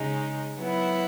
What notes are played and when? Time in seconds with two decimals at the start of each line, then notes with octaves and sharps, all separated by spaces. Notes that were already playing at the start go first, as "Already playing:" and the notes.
Already playing: C#3 G#3 D#4
0.57 F#3 B3 E4